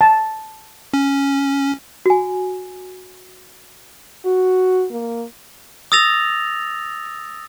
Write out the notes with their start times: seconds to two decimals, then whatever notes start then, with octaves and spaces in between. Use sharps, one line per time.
0.01 A5
0.94 C#4
2.06 F#4 G#5
4.26 F#4
4.92 A#3
5.92 D#6 E6 A6 A#6 F7